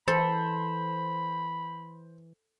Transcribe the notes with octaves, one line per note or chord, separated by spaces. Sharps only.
E3 A4 C5 B5